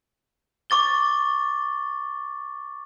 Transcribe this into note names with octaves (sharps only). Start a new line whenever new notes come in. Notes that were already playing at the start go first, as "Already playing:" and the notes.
C#6 D6 A6 G7